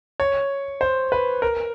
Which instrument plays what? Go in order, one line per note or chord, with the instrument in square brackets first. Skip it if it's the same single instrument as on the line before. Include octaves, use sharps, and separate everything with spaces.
[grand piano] C#5
C5
B4
A#4